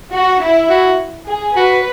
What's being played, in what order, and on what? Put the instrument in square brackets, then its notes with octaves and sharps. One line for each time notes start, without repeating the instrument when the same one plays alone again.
[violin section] F#4
E4
[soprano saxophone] F#4
[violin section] G#4
[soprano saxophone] F#4 [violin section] B4